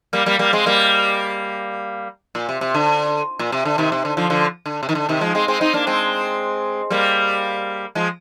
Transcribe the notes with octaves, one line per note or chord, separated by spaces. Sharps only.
G3 A#3
G3 A#3
G3 A#3
G#3 C4
G3 A#3
A#2
C3
C3
D3
A#2
C3
D3
C3 D#3
C3
D3
D3 F3
D3 F3
D3
C3
D#3
D3
C3 D#3
F3 G#3
G#3 C4
G#3 C4
C4 D#4
A#3 D4
G#3 C4
G3 A#3
F3 G#3